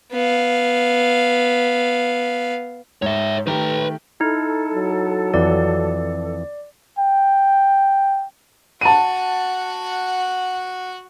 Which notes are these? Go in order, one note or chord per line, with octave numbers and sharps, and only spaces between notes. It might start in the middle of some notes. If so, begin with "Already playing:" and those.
B3 F5
G#2 C#5 E5
D#3 A3 G4 B4 A#5
D#4 E4 A4
F#3
F2 E3 D5
G5
F#4 F#5 A5 D#7